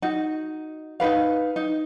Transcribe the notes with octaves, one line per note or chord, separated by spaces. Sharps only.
D#4 F#4
D#4 F#4 B4 F5
D#4